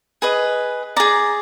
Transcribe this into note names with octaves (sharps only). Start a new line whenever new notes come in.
G#4 B4 D#5
G#4 D5 A#5